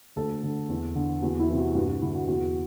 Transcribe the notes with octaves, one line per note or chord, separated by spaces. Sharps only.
D2 A4
D3
E2
D3
E2 F#4
E4
C3 E3
F#4
G2 F#4
F#4
D3 E4
F#4
E2 F#4